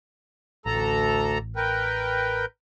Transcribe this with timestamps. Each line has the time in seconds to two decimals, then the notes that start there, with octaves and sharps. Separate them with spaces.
0.66 A1 D2 A4 A#5
1.56 A#4 B4 G5